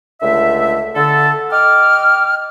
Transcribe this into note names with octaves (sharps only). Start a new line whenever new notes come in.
C#2 D3 A3 E5
D3 A4
D#5 G5 D6 F6